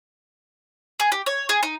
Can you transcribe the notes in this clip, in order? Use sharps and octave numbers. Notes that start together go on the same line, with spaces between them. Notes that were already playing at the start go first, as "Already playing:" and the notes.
G#4
G4
C#5
G#4
D#4